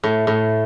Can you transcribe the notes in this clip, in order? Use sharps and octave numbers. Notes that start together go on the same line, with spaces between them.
A2
A2